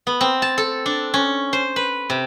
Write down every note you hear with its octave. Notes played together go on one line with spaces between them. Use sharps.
B3
C4
A5
A4
D4
C#4
C5
B4
C3